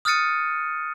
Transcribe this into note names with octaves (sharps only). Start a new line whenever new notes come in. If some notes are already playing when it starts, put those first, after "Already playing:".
D#6 F6 F#6 A6 C#7 D#7